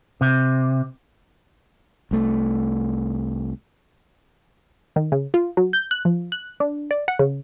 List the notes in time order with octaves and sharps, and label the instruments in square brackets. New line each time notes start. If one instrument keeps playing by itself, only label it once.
[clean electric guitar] C3
[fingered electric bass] C2 A3
[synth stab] D#3
C#3
F4
F#3
G6
F#6
F3
F#6
D4
D5
F#5
C#3